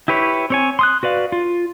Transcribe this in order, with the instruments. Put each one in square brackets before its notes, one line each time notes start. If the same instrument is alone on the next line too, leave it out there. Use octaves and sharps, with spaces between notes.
[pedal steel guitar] E4 G4 B4 C#5
C4 C#5 G#5
C6 D#6 F#6
F#4 B4 D5 F5
F4